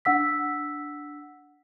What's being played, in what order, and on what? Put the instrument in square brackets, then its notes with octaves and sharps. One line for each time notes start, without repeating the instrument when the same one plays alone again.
[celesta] D4 F#5 E6 B6